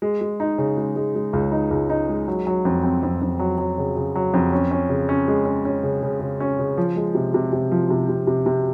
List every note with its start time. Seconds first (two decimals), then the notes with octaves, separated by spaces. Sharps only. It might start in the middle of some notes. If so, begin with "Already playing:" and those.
0.02 G#3
0.21 G#3
0.40 D#4
0.58 C#3
0.77 G#3
0.96 G#3
1.15 G#3
1.33 C#2
1.52 D#4
1.71 C#2
1.90 D#4
2.09 G#3
2.28 F#3
2.47 F#3
2.65 F2
2.84 C4
3.03 F2
3.22 F2
3.39 F#3
3.58 F#3
3.78 C#3
3.96 C#3
4.15 F#3
4.34 F2
4.53 C#4
4.71 C#4
4.89 C#3
5.09 C#4
5.28 G#3
5.45 C#4
5.65 C#4
5.83 C#3
6.02 C#3
6.20 C#3
6.40 C#4
6.59 C#3
6.78 F3
6.96 G#3
7.15 C3
7.34 C3
7.52 C3
7.71 F3
7.90 C3
8.09 C3
8.27 C3
8.46 C3